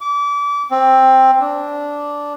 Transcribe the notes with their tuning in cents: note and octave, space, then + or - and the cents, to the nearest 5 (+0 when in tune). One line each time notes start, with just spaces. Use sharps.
D6 -30
C4 +10
D4 -10